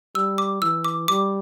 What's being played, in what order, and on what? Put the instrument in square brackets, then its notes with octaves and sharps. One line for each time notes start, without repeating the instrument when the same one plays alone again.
[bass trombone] G3 [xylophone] E6
[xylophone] D6
[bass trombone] E3 [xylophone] E6
[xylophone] D6
[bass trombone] G3 [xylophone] D6